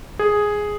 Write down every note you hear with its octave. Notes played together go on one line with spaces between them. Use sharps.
G#4